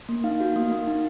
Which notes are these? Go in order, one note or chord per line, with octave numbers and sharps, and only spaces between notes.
A#3
D#4 F5
F#4
A#3
A#3
D#4